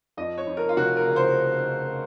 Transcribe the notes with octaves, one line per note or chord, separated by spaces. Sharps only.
F2 D#5
C#5
F2
A#4
F4
F1 F#4
A#4
C#3
C5